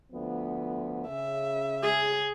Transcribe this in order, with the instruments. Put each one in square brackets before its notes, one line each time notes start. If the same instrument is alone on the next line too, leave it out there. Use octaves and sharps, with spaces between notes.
[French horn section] D2 F3 B3
[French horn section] C#3 [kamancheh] E5
[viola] G#4